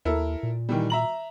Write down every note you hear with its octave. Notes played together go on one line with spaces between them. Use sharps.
D#2 E4 A4 A#4
A#2
D#3 E3 G3
E5 A#5 F#7